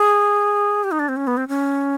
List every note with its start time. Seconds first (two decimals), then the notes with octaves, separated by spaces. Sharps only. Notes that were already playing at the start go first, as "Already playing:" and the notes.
Already playing: G#4
0.84 G4
0.91 D#4
0.99 D4
1.08 C4
1.16 C#4
1.27 B3
1.37 C4
1.48 C#4